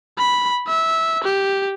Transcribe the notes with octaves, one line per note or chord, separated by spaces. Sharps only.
B5
E5
G4